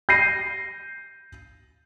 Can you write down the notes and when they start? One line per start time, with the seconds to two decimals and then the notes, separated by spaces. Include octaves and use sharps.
0.09 G6 A#6 C7 D#7